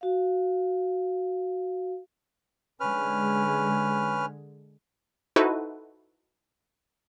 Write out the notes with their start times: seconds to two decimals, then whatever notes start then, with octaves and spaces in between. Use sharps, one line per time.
0.01 F#4 F5
2.80 D3 G#3 C#4 B4 F6
5.36 D#4 E4 F#4 A4 B4 C5